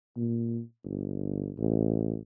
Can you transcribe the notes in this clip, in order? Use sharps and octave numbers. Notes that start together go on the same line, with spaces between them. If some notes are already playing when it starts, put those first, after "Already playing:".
A#2
G1
A1